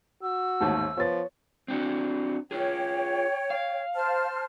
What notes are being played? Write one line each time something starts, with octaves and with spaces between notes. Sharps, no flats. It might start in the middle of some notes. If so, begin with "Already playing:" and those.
F#4 E6
A1 D#2 G#2 A5
F3 B3 C#5 A6
C4 D4 F#4
F4 G#4 C#5 G5
F5
C5 A5 F6